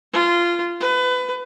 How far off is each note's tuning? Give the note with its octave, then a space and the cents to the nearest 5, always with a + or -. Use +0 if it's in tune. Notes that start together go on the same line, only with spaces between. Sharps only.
F4 -15
B4 +25